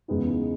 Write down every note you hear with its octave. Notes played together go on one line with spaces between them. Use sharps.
E2 C#3 G#3 B3 D#4